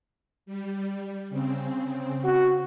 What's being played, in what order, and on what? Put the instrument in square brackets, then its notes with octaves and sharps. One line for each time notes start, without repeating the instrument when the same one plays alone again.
[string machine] G3
C#3 C4
[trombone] F#4